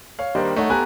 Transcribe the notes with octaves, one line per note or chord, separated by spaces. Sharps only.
C#5 F5
D#3 G3 A#3 D4 D#4 C5
A3 D#4 C#5 F#5
A3 B3 G4 G#5 A#5 F#6